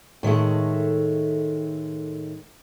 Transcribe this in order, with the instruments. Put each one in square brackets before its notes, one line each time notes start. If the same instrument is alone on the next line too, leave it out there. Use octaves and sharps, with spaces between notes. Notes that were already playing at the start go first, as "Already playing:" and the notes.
[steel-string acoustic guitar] A2 D#3 G#3 A3